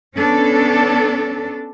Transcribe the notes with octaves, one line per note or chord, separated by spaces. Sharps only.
B3 C#4 D4 A4